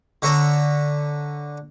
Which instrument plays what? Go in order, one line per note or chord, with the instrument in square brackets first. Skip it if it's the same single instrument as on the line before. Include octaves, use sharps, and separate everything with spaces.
[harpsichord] D3 C#5 E5 A#5 D#6